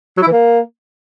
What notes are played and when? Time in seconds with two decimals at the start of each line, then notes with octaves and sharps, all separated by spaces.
0.17 F#3
0.22 E4
0.27 E3
0.32 A#3